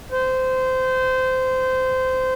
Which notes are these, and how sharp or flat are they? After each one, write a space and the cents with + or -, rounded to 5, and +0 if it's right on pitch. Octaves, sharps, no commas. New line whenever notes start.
C5 -20